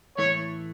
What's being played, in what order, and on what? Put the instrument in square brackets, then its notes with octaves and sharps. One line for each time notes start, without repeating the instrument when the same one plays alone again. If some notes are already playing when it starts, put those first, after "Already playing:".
[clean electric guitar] A2 E3 A3 [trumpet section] C#5